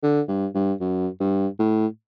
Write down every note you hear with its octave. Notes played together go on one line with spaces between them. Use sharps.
D3
G2
G2
F#2
G2
A2